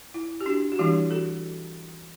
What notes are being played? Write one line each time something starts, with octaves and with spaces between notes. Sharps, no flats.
E4
G4
D4 F#4
F#4
E3 G3 D4 E4 G4
F#4 A4